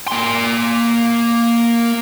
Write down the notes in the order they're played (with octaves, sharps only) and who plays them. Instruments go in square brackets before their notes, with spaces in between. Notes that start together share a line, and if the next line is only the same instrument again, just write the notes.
[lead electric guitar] A#3 C6